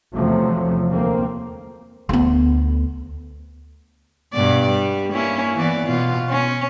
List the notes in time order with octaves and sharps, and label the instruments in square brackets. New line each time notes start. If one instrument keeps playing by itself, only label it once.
[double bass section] E2 C3 F3 F#3 A3
D2 A3 A#3 C4
[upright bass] D2 B3
[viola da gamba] G2 B2 D5
G3
A#3 C#4 E4
E3 B3 D5
B2 F4
C#4